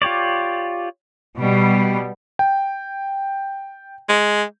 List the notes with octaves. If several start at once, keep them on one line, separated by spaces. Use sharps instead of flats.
F4 G4 C#5 D5
B2 G3
G5
G#3